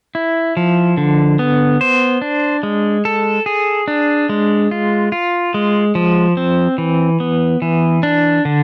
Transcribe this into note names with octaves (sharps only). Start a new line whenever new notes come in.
E4
F3
D3
B3
C5
D4
G#3
A4
G#4
D4
G#3
F4
F4
G#3
F3
C4
E3
B3
E3
D4
D3